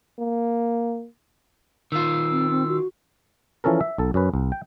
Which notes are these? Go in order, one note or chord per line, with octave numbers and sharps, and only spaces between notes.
A#3
D#3 F4 E6
C4
C4
F#4
E3 F3 C#4 A4 A#4
E5
B1 A4
F#2 C#4 B4
C2
G5